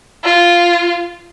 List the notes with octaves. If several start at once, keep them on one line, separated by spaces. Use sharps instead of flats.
F4